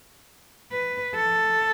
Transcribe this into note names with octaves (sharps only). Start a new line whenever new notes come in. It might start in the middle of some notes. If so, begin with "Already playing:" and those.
B4
A4